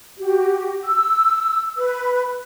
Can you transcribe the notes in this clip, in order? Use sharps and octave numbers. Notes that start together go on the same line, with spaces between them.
F#4 G4
E6
B4